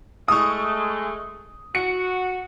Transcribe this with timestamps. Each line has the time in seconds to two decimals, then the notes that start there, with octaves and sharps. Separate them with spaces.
0.28 G#3 A3 C#6 D#6
1.75 F#4 C#7